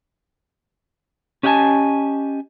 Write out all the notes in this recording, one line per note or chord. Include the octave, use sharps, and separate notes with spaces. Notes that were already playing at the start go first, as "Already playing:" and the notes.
C#4 G4 D#5 F#5 G#5 A5